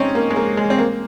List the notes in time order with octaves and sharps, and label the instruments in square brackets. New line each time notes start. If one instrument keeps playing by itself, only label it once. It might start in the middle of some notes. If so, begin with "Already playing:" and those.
Already playing: [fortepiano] C4 C#4 D#4
A#3
G#3
A#3
G#3
C4
A#3